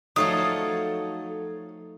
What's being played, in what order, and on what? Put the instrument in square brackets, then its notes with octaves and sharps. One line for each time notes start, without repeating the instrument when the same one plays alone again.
[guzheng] F3 A3 D#4 [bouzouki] F#3 A4 [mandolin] C#5 F5 D#6